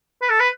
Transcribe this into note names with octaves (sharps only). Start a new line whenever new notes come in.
B4
A4
B4